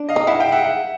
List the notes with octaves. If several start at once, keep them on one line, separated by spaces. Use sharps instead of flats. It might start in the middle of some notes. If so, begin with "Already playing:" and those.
Already playing: D4
D#5 F5
D#4
E4 E5 F#5
F5 G5
E5 F#5
E5 F#5